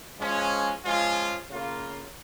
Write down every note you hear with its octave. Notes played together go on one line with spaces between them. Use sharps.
F3 G#3 C#4
F3 G#3 C#4 F4
C#3 A#3 F4